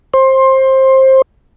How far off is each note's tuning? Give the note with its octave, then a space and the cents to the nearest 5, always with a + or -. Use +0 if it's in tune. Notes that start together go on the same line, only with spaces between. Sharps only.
C5 +20